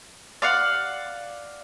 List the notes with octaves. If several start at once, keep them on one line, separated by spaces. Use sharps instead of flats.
D5 F5 F#5